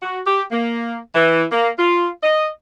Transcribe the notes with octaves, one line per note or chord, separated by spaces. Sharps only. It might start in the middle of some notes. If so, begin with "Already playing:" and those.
F#4
G4
A#3
E3
A#3
F4
D#5